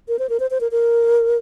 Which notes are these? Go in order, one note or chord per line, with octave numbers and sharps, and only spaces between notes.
A#4
C5
A#4
C5
C5
A#4
A#4